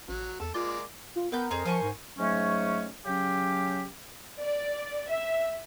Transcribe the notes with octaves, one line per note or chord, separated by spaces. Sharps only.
A1 F#3
E2 A4
G#3 A#3 F4 D5
F4
B3 A#4 B4 G5 G6
F2 G#4 C5 A#5
F3 C5 G#5 C#6
G#2
G#2 F#3 A3 C#4
C#3 F#3 C#4 G4
D5
E5